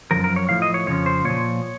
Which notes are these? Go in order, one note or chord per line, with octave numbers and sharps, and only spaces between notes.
F#2 C#3 F3 A#4
A#4
C#5
A2 F3 F5
D#5
C#5
F2 C#3 F3 C#5
C5
A#2 F3 C#5